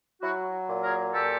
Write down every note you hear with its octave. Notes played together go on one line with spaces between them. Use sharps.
F#3 E4 F#4
A#2
G#4 A#4
A#2 G4 A4